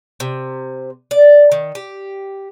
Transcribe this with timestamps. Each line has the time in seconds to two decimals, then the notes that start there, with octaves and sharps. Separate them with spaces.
0.20 C3
1.11 D5
1.52 D#3
1.75 G4